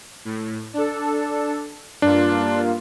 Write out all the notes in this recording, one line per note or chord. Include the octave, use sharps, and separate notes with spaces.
A2
D4 A4
G2 A#3 D4 F4